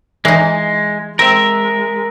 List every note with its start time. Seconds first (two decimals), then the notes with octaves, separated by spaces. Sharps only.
0.25 E3 G#3 D#4
1.19 G#3 C4 A#4 E5